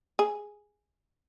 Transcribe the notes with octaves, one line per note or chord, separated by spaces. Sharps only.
G#4